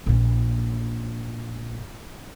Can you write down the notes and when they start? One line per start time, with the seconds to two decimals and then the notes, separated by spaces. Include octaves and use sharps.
0.06 A#1 A#2